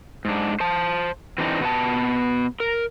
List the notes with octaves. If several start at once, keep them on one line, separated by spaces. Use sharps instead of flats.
G#2 D4
C5 A5
E3 C4 D4 D#4
B2 B3 C5 A5
A#4